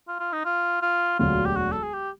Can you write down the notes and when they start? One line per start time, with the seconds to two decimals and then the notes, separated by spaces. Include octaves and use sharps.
0.08 F4
0.20 F4
0.33 D#4
0.45 F4
0.82 F4
1.19 E1 D2 D3 F#3 F4
1.46 G4
1.56 F#4
1.72 A4
1.83 G#4
1.93 G4